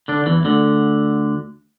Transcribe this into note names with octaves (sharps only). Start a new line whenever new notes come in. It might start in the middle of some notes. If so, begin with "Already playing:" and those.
D3 D4
E2 E3
D2 D3